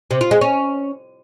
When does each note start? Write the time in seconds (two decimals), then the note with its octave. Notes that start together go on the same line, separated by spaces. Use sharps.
0.11 C3
0.21 F4
0.31 G#3
0.41 C#4